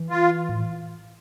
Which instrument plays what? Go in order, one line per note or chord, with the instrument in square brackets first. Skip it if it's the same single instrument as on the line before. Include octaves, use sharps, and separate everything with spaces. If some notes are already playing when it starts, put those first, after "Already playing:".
Already playing: [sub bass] E3
[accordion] F4
[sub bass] A2